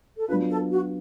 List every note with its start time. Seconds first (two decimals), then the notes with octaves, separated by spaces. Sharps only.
0.17 A4
0.28 F#3 B3 D4 F4 B4
0.49 A4
0.71 F#4